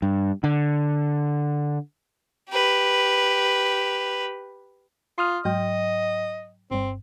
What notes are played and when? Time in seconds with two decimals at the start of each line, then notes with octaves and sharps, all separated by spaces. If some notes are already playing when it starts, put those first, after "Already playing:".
0.02 G2
0.44 D3
2.50 G4 B4
5.18 F4 C6 D#6 F6
5.45 G#2 F#3 D#5 G5
6.71 G1 G2 C4